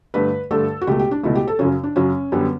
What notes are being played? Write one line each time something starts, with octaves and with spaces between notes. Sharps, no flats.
G2 D3 A3 B4
G2 D3 A3 A4
F#4
C#2 B2 A3 G4
G4
D4
C#2 B2 A3 E4
G4
A4
F#2 C#3 F#3 C#4
D4
F#2 C#3 F#3 C#4
F#2 D3 G3 B3